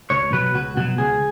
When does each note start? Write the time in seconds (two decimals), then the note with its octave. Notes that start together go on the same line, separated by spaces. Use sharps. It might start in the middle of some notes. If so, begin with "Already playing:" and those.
0.10 C#2 C#5
0.32 B2 F#3 B4
0.54 C#2 F#4
0.77 B2 F#3 F#4
0.98 C#2 G#4